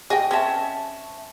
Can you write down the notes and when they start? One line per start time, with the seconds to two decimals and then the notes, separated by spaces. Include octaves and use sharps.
0.10 G#4 D#5 G5
0.31 C4 C#4 E5 A5